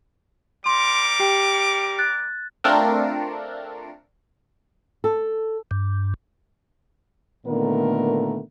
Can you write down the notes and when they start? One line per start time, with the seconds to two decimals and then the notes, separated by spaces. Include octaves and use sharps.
0.66 G3 A#4 C6 D6
1.20 G4 G5
1.99 F#6 A6
2.64 A3 C4 D4 F4 A4 A#4
5.04 A4
5.71 G2
7.46 A#2 D3 D#3 A3 B3 A#4